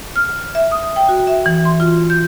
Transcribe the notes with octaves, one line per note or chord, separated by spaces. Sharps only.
F6
E5
D#6
G5
F#4
E5
E3
C6
F4
G6